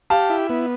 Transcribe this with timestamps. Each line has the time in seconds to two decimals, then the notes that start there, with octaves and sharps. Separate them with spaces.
0.10 G4 F5 A5
0.30 E4
0.50 B3